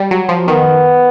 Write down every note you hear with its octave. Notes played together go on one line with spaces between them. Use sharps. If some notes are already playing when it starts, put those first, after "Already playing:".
Already playing: G3
F#3
F3
D#3 B3